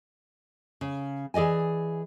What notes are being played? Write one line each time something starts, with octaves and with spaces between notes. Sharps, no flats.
C#3
E3 G#4 D5 D#5 G#5